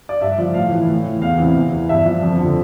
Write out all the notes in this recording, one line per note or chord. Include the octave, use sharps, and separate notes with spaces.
D5
G2 E5
F3
A2 F5
E3
A2
E3
E2 F5
C3 E3
E2
E3
G2 E5
F3
F2
D3 F3